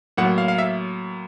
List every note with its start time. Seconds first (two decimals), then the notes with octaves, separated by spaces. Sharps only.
0.17 A2 F#3 A#3 F#5
0.38 F5
0.48 F5
0.58 E5